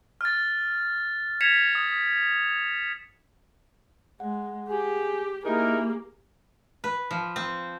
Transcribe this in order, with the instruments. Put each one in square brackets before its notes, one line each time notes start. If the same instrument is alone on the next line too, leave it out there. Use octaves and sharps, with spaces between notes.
[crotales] F6 A6
G#6 B6 C#7 E7 F7
D#6
[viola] G#3 [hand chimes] F#5
[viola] G4 [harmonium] G#4
[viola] A#3 G#4 [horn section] D#4 A#4 [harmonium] E4 [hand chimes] G4
[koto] B4
F3
C4